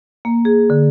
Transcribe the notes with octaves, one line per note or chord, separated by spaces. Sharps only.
A#3
G#4
D3